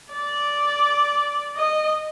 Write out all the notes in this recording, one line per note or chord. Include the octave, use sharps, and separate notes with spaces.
D5
D#5